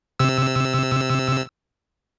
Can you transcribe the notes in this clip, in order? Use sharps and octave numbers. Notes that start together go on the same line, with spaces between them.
C3 E6